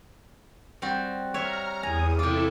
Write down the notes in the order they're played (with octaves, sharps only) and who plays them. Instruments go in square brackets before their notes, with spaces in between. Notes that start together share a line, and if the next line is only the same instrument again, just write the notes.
[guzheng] G3 C4 F#4
[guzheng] C#5 E5 [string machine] A#5 F6
[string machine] E2 D#6 [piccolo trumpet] G#5 [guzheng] A#5
[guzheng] C3 F4 [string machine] E4 A4 [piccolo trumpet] D6